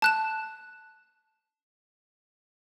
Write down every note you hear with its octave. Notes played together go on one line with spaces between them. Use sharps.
A5 F#6 E7